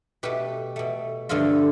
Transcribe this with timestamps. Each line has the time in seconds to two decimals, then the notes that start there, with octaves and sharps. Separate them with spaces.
0.23 B2 A3 G4 B4
0.76 B2 A3
1.29 G2 D3 F3 A3 F4 A4